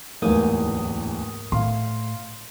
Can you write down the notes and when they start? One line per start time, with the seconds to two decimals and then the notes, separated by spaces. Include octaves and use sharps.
0.22 D1 A1 E2 G#2 A#3 D#6
1.52 A2 F5 C6